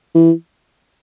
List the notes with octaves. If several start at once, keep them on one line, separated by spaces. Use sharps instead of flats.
E3